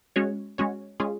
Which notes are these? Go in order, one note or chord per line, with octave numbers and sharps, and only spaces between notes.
G#3 C#4 F#4 C#5
G#3 C#4 F#4 C#5
G#3 C#4 F4 G#4